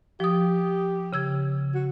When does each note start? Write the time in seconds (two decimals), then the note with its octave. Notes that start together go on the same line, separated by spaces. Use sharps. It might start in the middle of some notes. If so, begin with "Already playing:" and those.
0.20 F3 G4 D#6
1.13 C#3 E6 G#6
1.74 F#4